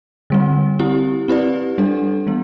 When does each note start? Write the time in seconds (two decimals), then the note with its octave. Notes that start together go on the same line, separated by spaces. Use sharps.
0.30 D3 G3 C4
0.79 C4 E4 G4
1.28 C4 E4 G4 B4 D5
1.78 G3 D4 A4
2.27 E3 G3 B3